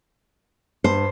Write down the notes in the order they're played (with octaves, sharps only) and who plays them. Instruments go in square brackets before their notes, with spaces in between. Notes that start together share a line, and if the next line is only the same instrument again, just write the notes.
[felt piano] G2 [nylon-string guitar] C5